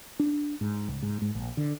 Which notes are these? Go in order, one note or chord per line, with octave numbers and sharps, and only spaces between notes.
D4
G#2
C#2
G#2
G#2
A#1
D3